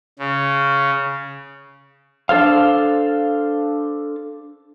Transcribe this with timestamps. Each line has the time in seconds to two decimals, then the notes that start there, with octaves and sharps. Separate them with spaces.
0.19 C#3
2.29 D4 A4 C5 F5